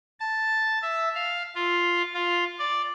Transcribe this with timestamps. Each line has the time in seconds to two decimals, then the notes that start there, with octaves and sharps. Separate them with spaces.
0.20 A5
0.82 E5
1.15 F5
1.55 F4
2.14 F4
2.59 D5